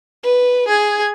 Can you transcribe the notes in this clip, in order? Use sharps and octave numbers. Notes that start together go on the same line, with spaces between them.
B4
G#4 G#6